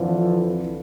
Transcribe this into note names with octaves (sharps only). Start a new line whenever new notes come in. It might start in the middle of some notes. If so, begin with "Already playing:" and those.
Already playing: F2 D3 E3 F3